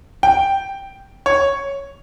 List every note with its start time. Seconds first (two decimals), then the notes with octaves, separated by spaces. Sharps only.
0.23 G5
1.26 C#5